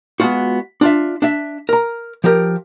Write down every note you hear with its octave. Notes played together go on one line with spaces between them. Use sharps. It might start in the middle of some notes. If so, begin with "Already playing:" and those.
G#3 B3 D4 F4 F#4
D4 F4 E5
D4 E5
A#4 A#5
F3 G4 A#4